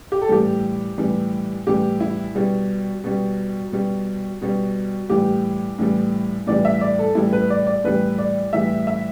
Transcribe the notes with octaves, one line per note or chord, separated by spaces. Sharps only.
G4
A4
A2 E3 G3 G4
A2 E3 G3
A2 E3 G3 G4
E4
B2 G3
B2 G3
B2 G3
B2 G3
A2 E3 G3 G4
A2 E3 G3
A2 E3 G3 D5
E5
D5
A4
A2 E3 G3 E4
B4
D5
D5
A2 E3 G3 B4
D5
A2 E3 G3 E5
E5